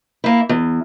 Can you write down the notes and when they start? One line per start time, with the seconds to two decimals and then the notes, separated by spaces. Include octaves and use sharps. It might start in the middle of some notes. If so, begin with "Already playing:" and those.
0.24 A#3 E4
0.49 E2